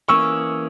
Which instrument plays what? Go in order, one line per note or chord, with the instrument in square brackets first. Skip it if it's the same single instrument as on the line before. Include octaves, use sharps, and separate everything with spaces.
[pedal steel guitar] E3 A#3 C#4 G#4 [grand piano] C#6 E6